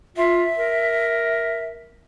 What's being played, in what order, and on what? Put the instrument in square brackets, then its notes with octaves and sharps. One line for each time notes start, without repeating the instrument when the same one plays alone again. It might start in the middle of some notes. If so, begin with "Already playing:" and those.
[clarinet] F4 [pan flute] E5
[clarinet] A#4